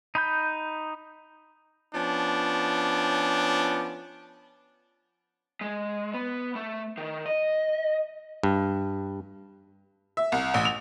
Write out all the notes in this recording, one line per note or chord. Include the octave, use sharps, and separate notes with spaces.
D#4 B5 G6
F3 B3 C#4 D4
G#3
B3
A3
D#3
D#5
G2
E5
C2
A1
F7